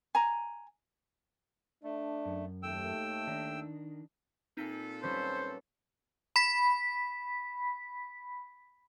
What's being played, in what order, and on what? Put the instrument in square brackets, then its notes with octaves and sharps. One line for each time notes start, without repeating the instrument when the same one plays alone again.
[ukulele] G#5 A#5
[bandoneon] A3 [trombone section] D4
[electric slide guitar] F#2
[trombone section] D#2 A3 [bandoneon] G5 E6
[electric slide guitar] D#3 D4
[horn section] A#2 A4 [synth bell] C4 D#4 B6
[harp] G3 C#4 B4 [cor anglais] C5
[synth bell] B5 B6